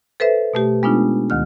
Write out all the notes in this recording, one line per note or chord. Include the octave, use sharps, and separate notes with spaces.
A4 B4 C5 E5
B2 A3 G4
G#3 B3 D4 D#4 F4
D2 D#3 F6